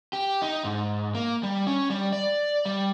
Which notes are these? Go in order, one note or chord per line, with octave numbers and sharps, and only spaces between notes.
G4
D#4
G#2
A#3
G3
C#4
G3
D5
G3